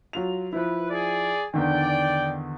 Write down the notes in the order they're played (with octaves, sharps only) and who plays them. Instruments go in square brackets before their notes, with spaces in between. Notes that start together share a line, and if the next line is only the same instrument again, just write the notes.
[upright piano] F#3 F4 F7
[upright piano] F3 E4 [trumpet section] B4
[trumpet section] G#4 D5
[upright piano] E2 D3 D#3 [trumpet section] D5 G5